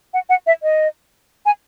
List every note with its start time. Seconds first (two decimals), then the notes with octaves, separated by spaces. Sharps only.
0.14 F#5
0.29 F#5
0.47 E5
0.63 D#5
1.46 G#5